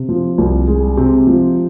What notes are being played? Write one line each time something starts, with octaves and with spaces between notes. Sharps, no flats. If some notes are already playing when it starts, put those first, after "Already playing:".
Already playing: C3
F3
C2
G#3
C3
F3